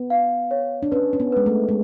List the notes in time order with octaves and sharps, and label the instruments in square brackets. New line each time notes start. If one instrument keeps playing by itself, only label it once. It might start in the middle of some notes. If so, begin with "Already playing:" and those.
Already playing: [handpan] B3
[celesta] F5
C#5
[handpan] D4
[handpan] C#4 [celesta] B4
[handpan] C#4
B3
[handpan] G#3 [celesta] B4
[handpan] A3
G#3